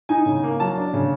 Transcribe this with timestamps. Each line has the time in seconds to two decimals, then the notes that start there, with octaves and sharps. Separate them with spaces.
0.09 D#4 G#5
0.26 C#3
0.44 A#3
0.60 F#3 A5
0.77 D4
0.94 C#3